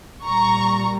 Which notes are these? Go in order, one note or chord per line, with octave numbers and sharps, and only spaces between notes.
A#2 G3 A#5 C#6